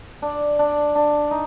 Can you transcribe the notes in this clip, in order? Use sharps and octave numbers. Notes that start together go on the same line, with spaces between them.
D4
D4
D4
D#4